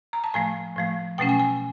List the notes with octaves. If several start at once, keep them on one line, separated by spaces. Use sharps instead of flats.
A#5
A5
A2 F3 A3 G#5
A2 F3 A3
B2 F#3 A3 C#4 G5
G#5
G#5